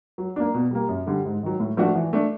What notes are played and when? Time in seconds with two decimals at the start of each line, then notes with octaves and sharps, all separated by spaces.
0.18 F#3
0.36 A#3 D4
0.54 B2
0.71 G3 A#3
0.89 F#2
1.07 D3 G3
1.25 G#2
1.43 D#3 F#3
1.60 A2
1.77 F3 A3 D4 F#4
1.95 E3
2.13 A3 D4